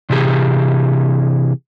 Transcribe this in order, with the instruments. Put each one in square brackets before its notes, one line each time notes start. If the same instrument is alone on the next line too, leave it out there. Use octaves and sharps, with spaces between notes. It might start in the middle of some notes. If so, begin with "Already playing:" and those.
[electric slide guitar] C3 E3 G4 G#4